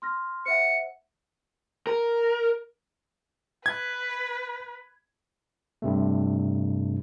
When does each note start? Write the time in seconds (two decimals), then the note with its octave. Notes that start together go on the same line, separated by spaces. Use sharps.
0.02 C6 F6 A#6
0.46 C5 E5 F#5 C#7
1.87 A#4
3.66 B4 G#6
5.82 G2 C3 A3